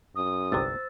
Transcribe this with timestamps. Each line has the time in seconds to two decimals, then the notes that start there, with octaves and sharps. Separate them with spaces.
0.16 F#2 D#6
0.52 G1 C2 C3 C5 E6 A6